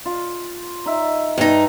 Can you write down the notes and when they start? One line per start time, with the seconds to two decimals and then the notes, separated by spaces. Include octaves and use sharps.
0.06 F4
0.86 D#4 E5
1.38 G2 D#4